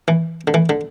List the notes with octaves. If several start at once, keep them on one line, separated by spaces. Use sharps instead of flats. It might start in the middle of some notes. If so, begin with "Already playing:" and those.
E3
D3
E3
D3